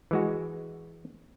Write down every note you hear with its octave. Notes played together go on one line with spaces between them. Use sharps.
E3 G#3 F#4